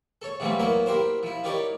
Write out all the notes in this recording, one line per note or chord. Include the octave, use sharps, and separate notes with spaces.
A4 C#5
C3 E3 F#3 G3 A#3 C4
F#3 A#3 B3 E4 A#4
E4 G4 A#4 C5
F3 E4
D#4 E4 G4 A#4 C#5 D5